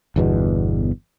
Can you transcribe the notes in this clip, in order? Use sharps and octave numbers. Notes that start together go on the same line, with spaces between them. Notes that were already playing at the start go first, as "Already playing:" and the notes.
G1 E2 B2